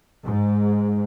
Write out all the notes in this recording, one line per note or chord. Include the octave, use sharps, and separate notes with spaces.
G#2